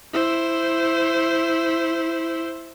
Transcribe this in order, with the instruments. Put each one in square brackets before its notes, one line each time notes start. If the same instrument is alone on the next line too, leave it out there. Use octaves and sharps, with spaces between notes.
[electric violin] E4 C5